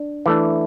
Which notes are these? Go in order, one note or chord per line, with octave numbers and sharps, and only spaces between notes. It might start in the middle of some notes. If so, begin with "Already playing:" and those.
Already playing: D4
E3 A3 D4